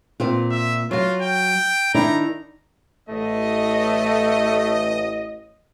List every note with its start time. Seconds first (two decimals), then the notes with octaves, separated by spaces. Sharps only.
0.20 A#2 C4 F4
0.51 E5
0.91 F#3 F4 F5
1.22 G5
1.94 D#3 D4 E4 A#5
3.09 A1 A3 D#5